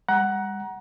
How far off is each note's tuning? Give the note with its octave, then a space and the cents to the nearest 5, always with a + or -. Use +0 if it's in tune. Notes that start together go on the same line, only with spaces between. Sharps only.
G3 +45 F#5 +10 A#5 +25